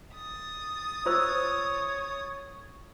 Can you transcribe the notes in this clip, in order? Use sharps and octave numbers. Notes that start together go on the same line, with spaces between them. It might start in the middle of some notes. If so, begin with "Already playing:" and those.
D#6 A6
F4 C5 C#5 E6